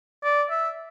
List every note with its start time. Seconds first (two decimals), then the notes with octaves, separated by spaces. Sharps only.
0.24 D5
0.51 E5